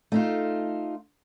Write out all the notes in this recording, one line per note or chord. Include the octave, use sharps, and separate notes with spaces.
A3 D#4 F4